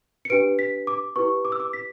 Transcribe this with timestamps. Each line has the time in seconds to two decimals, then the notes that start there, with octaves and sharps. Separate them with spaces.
0.25 C#7
0.30 D4 G4 B4 D7
0.59 B6
0.87 D6
1.16 E4 G4 B4 C#6
1.45 D6
1.52 E6
1.60 D6
1.73 B6